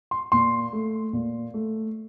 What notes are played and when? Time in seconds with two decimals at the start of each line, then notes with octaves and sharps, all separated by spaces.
0.11 C6
0.32 A#2 C6
0.73 A3
1.13 A#2
1.54 A3